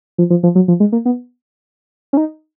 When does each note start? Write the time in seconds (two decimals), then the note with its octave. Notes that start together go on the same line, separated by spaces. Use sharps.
0.18 F3
0.30 F3
0.43 F3
0.55 F#3
0.68 F3
0.80 G#3
0.92 A#3
1.05 B3
2.13 C#4
2.17 D#4